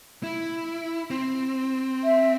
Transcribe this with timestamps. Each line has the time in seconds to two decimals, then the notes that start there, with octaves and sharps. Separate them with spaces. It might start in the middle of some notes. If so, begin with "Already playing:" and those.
0.23 E4
1.10 C4
2.04 E5